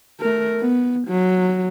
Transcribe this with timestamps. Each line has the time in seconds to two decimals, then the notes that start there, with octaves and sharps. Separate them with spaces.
0.20 A3 A#4
0.60 B3
1.08 F#3